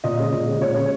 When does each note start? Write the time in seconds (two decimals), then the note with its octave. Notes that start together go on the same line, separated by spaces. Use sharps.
0.04 A#2 D#5
0.19 G#3 C#4
0.32 A#2
0.47 G#3 C#4
0.61 A#2 C#5
0.76 G#3 C#4